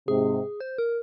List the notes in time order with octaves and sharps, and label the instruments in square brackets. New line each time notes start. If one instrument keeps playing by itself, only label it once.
[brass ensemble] G#2 C3 [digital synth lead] G#4
[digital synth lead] C5
A#4